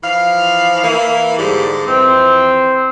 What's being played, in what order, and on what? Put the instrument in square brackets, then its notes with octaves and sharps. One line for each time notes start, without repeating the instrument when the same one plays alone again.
[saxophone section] E3 F3 F5
E3 A#3
G#2 D3 G3
[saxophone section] F2 E3 [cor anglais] C4